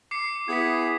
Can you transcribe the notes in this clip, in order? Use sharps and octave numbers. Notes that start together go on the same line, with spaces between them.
D6 C7 C#7
B3 E4 G#4 G#6 B6